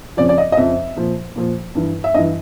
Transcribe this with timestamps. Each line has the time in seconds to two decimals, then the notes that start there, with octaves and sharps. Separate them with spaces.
0.17 F2 C#3 F3 D5
0.29 D5
0.38 D#5
0.52 D#5
0.57 F2 C#3 F3 E5
0.96 A#2 F3
1.36 A#2 F3
1.75 G2 E3
2.04 E5
2.14 G2 D#5
2.19 E3